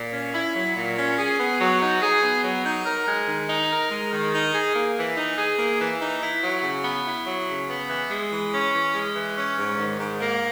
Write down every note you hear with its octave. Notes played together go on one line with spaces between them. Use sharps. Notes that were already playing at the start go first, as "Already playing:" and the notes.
Already playing: A#2
C#4
E4
F#3
A#2
C#4
G#4
B3
F#3
D#4
G#4
B3
F#3
D#4
A#4
G#3
D#3
D#4
A#4
G#3
D#3
D#4
G#4
A#3
E3
D#4
G#4
A#3
E3
D#4
E4
F#3
C#3
B3
E4
F#3
C#3
B3
E3
G#3
E3
C#4
E3
G#3
E3
C#4
G#2
D#3
G#2
A#3